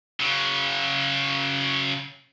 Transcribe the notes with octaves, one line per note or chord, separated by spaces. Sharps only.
C#3 F#3